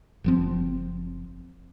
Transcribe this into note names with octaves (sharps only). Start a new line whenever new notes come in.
F#1 F3 C4